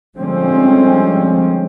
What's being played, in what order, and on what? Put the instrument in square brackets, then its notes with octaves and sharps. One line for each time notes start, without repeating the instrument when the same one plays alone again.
[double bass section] D3 F3 G3 G#3 C4 C#4